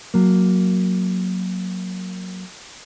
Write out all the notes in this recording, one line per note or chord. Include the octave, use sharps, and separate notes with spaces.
F#3 A#3